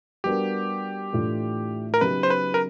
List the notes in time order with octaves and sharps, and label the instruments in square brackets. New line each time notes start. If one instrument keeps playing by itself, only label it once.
[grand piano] G3 B3 D4 F#4 A#4 [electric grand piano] G4
[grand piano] A2 E3 A3 D4 F4
[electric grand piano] A#4
[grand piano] C#3 F#3 B3 D#4 G4 [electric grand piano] B4
[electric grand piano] C5
B4
A#4